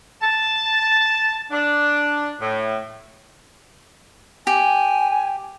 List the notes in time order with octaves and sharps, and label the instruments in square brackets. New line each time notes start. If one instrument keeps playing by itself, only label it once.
[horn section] A5
D4
A2
[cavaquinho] G4 [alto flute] G#5